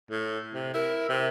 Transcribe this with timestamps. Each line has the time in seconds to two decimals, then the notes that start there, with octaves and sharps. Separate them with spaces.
0.11 A2
0.54 C3
0.74 E4 A#4
1.09 C3